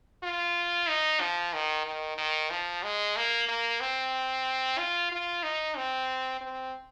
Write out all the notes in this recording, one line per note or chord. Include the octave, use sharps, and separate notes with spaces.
F4
D#4
F3
D#3
D#3
D#3
F3
G#3
A#3
A#3
C4
F4
F4
D#4
C4
C4